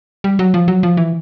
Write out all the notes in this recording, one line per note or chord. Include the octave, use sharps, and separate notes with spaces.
G3
F#3
F3
F#3
F3
E3